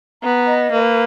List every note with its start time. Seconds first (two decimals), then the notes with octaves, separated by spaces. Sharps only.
0.23 B3 A#5
0.47 D#5
0.71 A#3 B4